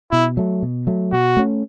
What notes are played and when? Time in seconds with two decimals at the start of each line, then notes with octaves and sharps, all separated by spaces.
0.11 B2 E4
0.37 F#3 A3
0.62 B2
0.87 F#3 A3
1.12 B2 F#4
1.37 A3 C#4